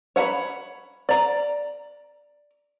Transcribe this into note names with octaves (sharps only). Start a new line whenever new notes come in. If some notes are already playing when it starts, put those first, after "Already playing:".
C#5 F#5 A5 B5
D5 A#5